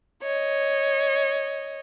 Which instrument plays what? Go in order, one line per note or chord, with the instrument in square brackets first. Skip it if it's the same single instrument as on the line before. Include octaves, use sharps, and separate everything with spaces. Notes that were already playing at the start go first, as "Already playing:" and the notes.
[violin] C#5 D#5